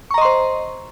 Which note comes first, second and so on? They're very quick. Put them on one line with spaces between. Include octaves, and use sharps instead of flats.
C#6 A#5 D#5 C6 C5